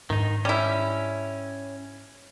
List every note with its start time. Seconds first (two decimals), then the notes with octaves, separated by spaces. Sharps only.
0.10 G#2 D#3 D4 D#4
0.45 G3 C#4 E4